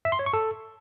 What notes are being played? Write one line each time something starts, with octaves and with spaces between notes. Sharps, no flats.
E5
C6
C#5
C#6
A4